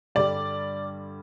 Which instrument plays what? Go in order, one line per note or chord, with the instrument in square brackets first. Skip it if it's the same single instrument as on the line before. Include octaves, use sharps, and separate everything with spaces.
[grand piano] G2 D3 G3 D5